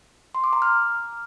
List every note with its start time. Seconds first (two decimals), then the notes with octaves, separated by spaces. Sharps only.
0.35 C6
0.44 D6
0.53 A#5
0.62 F6